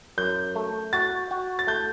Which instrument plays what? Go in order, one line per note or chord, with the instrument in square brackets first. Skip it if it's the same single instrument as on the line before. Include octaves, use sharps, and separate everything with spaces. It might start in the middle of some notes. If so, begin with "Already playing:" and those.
[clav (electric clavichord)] F#2 [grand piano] G6
[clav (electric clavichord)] A3
[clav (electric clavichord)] F#4 [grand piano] A6
[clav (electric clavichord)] F#4
[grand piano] A6
[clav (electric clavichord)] A3 [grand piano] G6